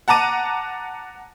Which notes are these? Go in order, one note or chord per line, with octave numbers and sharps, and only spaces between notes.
F#5 A5 A#5 D6 D#7